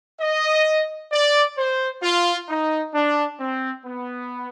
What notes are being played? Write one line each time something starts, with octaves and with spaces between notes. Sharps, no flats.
D#5
D5
C5
F4
D#4
D4
C4
B3